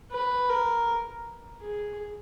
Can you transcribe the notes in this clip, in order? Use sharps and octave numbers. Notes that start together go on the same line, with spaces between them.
B4
A#4
G#4